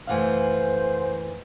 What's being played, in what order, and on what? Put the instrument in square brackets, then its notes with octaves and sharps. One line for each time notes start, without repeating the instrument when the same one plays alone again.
[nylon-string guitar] F#2 E3 A3 [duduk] C5 [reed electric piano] F5 F#5 G#5